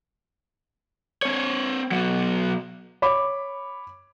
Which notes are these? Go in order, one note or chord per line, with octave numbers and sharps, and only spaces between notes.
C4 C#5
F#3 B3
C#5 B5 D6